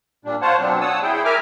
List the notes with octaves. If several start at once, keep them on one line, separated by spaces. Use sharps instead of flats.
A#2 G3 D4
F4 C5 C#5 F#5 A5
B2 F#3 C4 D4
C#5 F#5 A5 D#6 E6
E4 G#4 G5
A#4 E5 G#5 D6 F6